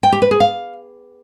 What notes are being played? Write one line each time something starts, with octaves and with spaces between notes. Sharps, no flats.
G5
G4
B4
G#4
F5